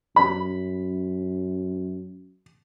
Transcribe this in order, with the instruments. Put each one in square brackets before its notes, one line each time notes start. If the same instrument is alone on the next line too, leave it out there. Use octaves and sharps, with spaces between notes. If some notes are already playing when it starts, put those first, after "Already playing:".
[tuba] F#2 [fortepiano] B5